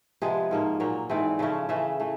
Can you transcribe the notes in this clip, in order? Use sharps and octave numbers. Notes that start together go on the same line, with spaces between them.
C3 F3 G#3 B3 G#4
G#2 F3 A#3
A#2 F#3 A#3 C#5
G#2 E3 A3 C4 D5
C#3 F3 A3 C#4
C#3 E3 A3 E5
E3 A3